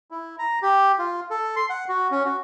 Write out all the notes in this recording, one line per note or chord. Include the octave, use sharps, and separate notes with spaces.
E4
A#5
G4
F4
A4
C6
F#5
F#4
C#4
F#4